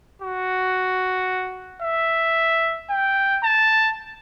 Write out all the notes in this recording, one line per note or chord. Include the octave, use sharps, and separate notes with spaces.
F#4
E5
G5
A5